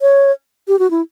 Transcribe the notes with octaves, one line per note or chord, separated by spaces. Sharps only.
C#5
G4
F#4
E4